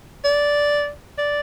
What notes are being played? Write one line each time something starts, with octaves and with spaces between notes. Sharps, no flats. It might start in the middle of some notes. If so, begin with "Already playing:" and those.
D5
D5